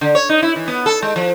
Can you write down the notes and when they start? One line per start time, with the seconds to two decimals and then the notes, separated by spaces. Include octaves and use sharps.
0.01 D3
0.15 C#5
0.29 D#4
0.42 E4
0.56 E3
0.68 B3
0.86 A4
1.02 G#3
1.16 F3